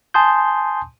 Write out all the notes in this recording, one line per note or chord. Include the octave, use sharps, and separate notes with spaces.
G#5 A5 C6 D#6 G6